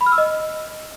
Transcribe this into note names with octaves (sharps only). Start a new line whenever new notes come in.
B5
F6
E6
D#5